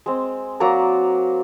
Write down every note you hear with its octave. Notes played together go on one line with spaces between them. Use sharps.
G#3 C4
F#3 A#3 D5 A#5